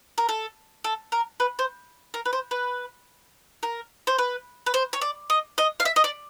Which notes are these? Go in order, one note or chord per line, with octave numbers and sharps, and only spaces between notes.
A#4
A4
A4
A#4
B4
C5
A#4
B4
C5
B4
A#4
C5
B4
B4
C5
C#5
D5
D#5
D#5
F5
E5
D#5
D5